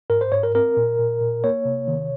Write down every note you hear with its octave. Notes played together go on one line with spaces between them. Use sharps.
G#2 A#4
C5
G#2 C#5
A#4
C4 A#4
A#2
A#2
A#2
A#3 C#5
C3
D#3